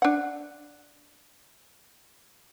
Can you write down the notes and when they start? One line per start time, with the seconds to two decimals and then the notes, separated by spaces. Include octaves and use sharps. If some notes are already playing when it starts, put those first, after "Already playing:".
0.02 D4 F#5